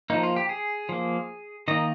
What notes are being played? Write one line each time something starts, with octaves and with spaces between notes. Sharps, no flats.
F3 A#3 D#4
F4
G4
G#4
F3 A#3
D#3 A#3 D#5